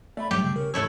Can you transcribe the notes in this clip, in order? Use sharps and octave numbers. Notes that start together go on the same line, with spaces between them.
A3 D5 E5 B5
G2 F#3 G3 G4
C#3 G3
C#3 A#4
G#2 E3 A3 E4 C#5 E6